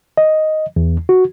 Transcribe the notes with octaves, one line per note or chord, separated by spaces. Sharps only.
D#5
E2
F#4